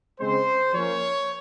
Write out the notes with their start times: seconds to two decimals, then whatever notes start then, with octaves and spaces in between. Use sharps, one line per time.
0.19 C#3 G#3 C4 C5
0.73 F3 A#3 C#4 C#5